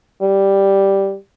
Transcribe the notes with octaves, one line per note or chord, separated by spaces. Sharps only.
G3